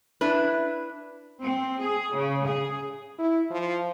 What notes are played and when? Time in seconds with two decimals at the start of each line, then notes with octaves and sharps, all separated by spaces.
0.21 D4 E4 B4
1.42 C4
1.81 G#4
2.16 C#3
2.47 G#4
3.19 E4
3.51 F3